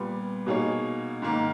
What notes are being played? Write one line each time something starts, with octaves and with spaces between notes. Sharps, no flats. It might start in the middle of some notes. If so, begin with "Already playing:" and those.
Already playing: A#2 G3 B3
B2 A#3 D#4 G#4 C#5
G#2 D#3 A#3